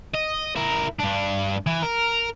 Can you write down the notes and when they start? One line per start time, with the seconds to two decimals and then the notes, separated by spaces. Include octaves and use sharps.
0.14 D#5
0.56 E4 A#4
1.00 G2 D4
1.67 E3
1.83 A#4